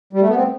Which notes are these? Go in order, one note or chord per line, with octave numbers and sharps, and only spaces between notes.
G3
A3
B3
C4